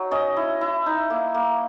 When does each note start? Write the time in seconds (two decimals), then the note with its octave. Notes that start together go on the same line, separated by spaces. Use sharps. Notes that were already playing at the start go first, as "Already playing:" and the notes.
Already playing: F#3 D#4
0.11 C#4 D#5
0.37 E4
0.61 E4
0.86 D#4
1.10 A#3
1.34 A#3